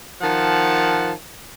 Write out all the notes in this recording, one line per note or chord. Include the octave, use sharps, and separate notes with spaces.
D#3 F3 F#5 A5